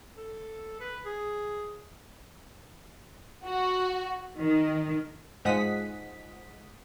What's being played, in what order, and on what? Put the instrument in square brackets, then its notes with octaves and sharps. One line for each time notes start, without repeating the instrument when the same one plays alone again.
[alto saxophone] A4
B4
G#4
[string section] F#4
D#3
[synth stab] G#2 F3 G#3 F#5 D#6 B6